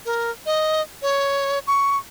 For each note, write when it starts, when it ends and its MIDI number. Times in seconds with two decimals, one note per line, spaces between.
0.06 0.31 70
0.46 0.82 75
1.02 1.59 73
1.67 1.97 85